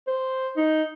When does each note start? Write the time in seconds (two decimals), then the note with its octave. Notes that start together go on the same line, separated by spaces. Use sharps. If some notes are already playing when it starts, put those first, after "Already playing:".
0.07 C5
0.57 D#4